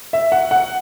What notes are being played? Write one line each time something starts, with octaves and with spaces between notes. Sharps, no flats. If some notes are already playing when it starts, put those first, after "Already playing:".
E5
F#5
F#5